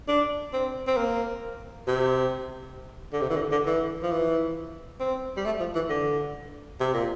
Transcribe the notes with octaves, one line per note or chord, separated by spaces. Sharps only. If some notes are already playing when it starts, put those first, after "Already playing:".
D4
C4
C4
A#3
C3
D3
C3
E3
D3
D3
E3
F3
E3
C4
G3
A3
F3
E3
D3
C3
A#2